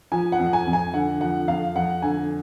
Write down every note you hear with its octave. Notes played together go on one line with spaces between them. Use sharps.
F3 G#5
F#5
F2
G#5
F2
G#5
D3 F#5
F3 F#5
F2 F5
F2 F#5
D3 G#5